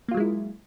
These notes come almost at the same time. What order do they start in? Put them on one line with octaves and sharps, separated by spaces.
A#3 F4 F#3 G#3 E4